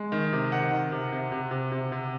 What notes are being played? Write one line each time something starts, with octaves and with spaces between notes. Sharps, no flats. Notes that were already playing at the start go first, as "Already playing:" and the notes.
Already playing: G#3
D#3
C3
D#3 F#5
D#3
C3
C3
C3
C3
C3
C3